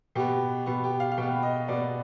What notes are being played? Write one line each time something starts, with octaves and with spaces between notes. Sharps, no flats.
B2 B3 G4
B2 B3
G4
F5
F5
B2 B3 G5
D#5
B2 B3 D5